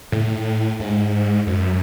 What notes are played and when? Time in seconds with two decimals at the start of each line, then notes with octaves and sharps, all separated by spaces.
0.12 A2
0.80 G#2
1.47 F#2